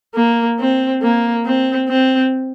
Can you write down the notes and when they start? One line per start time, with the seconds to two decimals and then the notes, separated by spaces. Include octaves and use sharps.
0.15 A#3
0.59 C4
1.02 A#3
1.45 C4
1.89 C4